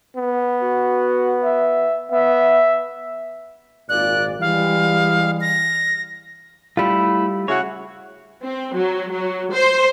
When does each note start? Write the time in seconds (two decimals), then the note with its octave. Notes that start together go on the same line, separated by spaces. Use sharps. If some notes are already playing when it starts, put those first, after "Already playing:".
0.16 B3
0.62 F#4
1.43 E5
2.11 B3 E5
3.89 G#1 A#2 D5 F#6
4.41 E3 G3 G#3 F5
5.41 A#6
6.77 G3 A3 E4 F4
7.48 C#3 E4 F#4 C#5
8.44 C4
8.76 F#3
9.12 F#3
9.52 C5